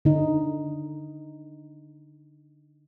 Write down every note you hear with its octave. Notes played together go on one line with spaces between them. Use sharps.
D3 D#4